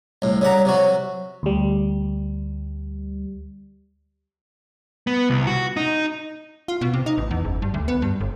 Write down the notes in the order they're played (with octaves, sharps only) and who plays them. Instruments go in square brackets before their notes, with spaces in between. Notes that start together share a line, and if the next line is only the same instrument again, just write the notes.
[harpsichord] C2 A2
C#3 G3 F#5 A#5
C3 F#3 F#4
[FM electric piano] D2 G3
[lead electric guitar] B3
C2
F#4
D#4
[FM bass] F4
B2
C3
D#4
A1
E2
F#1
G2
D2
B3
G2
G1